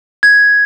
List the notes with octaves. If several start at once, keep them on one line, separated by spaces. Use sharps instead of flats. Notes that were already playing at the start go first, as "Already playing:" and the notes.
G#6